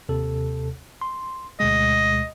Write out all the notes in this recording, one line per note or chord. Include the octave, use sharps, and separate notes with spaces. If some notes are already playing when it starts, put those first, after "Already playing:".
D#2 C3 A4
C6
D2 B2 G#3 D#5